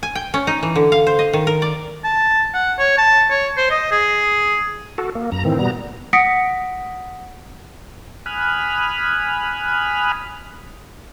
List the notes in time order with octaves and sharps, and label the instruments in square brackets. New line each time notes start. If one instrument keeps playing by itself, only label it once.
[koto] G#5
G5
C#4
D#4
E3
D3
F5
C5
D#5
D#3
A#4
D5
[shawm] A5
F#5
C#5
A5
C#5
C5
D#5
G#4
[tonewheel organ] F#4 A4
A#3
F#2 A#5
A2 D#3 E3 C4
B2 G3 B3 A#5
[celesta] F#5 D#6 A#6 B6 C#7 D7
[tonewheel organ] G#5 B5 D#6 F6 F#6